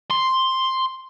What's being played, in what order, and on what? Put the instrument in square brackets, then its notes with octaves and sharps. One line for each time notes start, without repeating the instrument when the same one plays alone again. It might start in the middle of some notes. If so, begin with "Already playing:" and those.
[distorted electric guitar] C6